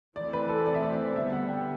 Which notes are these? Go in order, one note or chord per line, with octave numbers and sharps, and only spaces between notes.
E3 A3 C4 D5
B4
A4
D5
E5
D5
C5
D3 G3 B3 E5
F#5
G5